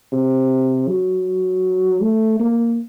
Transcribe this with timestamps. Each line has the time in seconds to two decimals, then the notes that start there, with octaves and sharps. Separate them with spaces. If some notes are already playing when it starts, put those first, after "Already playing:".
0.12 C3
0.88 F#3
2.01 A3
2.40 A#3